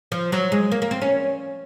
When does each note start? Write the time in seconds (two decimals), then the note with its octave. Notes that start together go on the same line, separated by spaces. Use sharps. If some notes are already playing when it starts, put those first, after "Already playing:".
0.12 F3
0.32 F#3
0.52 G#3
0.72 A#3
0.82 A#3
0.91 C4
1.02 C#4